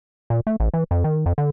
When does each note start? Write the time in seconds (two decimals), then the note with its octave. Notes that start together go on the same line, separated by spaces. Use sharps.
0.30 A#2
0.47 A3
0.60 A1
0.74 E3
0.91 F2
1.04 D#3
1.26 F2
1.38 D3